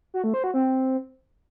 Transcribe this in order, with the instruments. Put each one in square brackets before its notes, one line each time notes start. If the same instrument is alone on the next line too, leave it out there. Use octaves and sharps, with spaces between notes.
[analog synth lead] F#4
A3
C5
F#4
C4